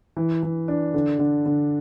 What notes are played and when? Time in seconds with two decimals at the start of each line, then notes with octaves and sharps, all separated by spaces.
0.17 E3
0.43 E3
0.68 D4
0.94 D3
1.19 D3
1.46 D3